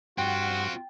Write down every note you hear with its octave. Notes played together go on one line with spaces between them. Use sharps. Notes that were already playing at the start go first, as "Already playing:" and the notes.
G2 C4 F4 F#4 F#5 G5